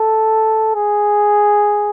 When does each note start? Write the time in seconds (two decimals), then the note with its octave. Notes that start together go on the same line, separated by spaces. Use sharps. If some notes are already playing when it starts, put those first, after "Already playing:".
Already playing: A4
0.75 G#4